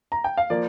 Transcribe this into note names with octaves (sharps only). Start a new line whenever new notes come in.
A#5
G5
F5
F3 A#3 D5